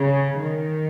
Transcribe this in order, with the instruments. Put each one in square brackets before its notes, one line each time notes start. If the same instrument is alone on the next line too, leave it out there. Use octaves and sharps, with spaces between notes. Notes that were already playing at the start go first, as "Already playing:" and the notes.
Already playing: [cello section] C#3
D#3